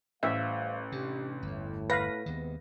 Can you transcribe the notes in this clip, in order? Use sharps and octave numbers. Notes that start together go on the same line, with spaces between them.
A1 G3 C5 E5 F5
C3 D4 G4
G1 E2 A2
B4 F5 A#6
D#2 C3 D#3 G#3 B3